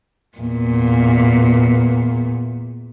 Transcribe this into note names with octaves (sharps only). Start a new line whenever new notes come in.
E2 A#2